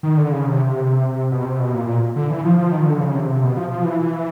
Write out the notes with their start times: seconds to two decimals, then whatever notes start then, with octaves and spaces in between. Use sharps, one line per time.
0.03 D#3
0.17 D3
0.32 C#3
0.46 C3
1.31 B2
1.45 C3
1.60 B2
1.74 A#2
1.87 A#2
2.16 D3
2.30 E3
2.44 F3
2.58 F3
2.72 D#3
2.86 D3
3.00 C#3
3.15 C3
3.29 C3
3.43 B2
3.57 F3
3.72 F3
3.85 E3